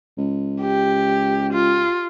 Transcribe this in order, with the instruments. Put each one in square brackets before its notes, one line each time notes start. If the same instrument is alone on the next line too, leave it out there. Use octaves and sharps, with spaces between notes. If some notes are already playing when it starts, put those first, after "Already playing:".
[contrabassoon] C#2
[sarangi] G4
F4